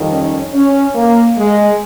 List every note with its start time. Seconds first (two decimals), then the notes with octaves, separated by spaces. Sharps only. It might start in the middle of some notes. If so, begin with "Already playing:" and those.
Already playing: F2 D#3 G3
0.11 C#4
0.53 C#4
0.95 A#3
1.38 G#3